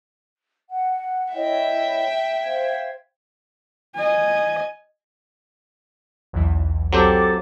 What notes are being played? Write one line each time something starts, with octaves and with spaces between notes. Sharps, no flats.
F#5
E4 C#5 D#5 E5 G5
C5 F5 G#6
D#5 G#5
B1 E2 E3
F#3 C4 G4 A4 D6